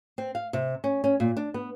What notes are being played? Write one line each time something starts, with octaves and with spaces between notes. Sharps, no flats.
C4
F5
C3
C#4
C#4
A#2
D4
B3